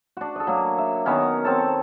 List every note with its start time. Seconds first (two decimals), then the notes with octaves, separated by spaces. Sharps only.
0.17 D4 F#4
0.35 A4 D#5
0.47 F#3 A#3 D4
0.78 E5
1.05 D#3 B3 C#4 A#4
1.45 C4 A4 C#5 A5